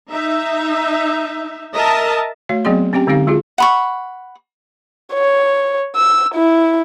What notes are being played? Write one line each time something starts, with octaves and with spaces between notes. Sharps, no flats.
D#4 E5
A#4 D#5 E5 A5
A3 F#4 C#5 F5
F#3 B3 C4 G#4 D#5 C6
C4 C#4 G4 G5 A#5
D3 G#3 C4 D#4 G4 F5
G#3 F4 F#4 G#4
F#5 B5 C#6
C#5
E6
E4